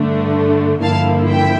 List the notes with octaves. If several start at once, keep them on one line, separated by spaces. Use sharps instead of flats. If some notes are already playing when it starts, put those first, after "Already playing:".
Already playing: G2 D3 A3 D4
G2 D3 F3 A#3 E4 F5 A5
E5 G5